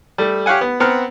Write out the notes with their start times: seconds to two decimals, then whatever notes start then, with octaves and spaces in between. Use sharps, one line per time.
0.18 G3 A3
0.46 G4 C#5 F5 F#5 G#5
0.61 B3
0.80 B3 C4 F#5 A#5 F6